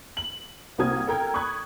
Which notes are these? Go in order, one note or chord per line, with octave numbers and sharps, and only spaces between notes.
F#7
C2 A#3 C4 F#4 D#6 G#6
A4 A#4 G5 A#5 G#6
B5 C#6 D#6 F#6 G#6